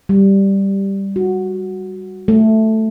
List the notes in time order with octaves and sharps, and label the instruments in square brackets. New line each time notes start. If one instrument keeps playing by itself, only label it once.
[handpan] G3
F#4
A3